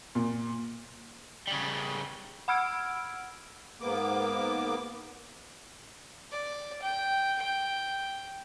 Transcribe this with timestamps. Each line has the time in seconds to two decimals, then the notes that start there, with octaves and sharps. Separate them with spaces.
0.15 A#2
1.48 C#3 G3
2.48 F#5 B5 E6 F6 G#6 D7
3.81 G#2 A#3 B3 D6
6.31 D5
6.82 G5
7.39 G5